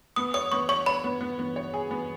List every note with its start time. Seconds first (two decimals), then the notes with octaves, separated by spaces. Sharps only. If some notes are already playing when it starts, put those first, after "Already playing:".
0.16 B3 D#6
0.34 C#5 D#6
0.52 B3 C#6
0.69 C#5 C#6
0.86 C#5 B5
1.04 B3
1.21 B3
1.39 B3
1.56 C#5
1.74 G#4
1.91 B3